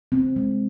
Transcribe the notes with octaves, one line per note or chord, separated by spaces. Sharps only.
C4
G#3